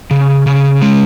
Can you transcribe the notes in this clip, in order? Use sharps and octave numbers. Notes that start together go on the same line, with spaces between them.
C#3
C#3
G#3